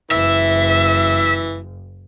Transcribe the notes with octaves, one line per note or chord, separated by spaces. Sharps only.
F#1 E3 E5